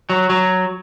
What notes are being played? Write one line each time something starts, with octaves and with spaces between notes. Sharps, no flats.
F#3
F#3